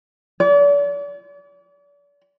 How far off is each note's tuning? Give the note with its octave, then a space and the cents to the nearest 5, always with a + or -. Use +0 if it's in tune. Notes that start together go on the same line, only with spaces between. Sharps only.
D5 -40